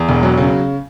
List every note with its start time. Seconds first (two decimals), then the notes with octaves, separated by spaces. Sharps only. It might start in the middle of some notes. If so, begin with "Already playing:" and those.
Already playing: E2
0.09 E1
0.23 F#3
0.37 C#3